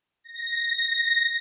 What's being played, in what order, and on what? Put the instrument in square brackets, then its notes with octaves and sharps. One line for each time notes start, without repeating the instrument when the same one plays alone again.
[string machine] A#6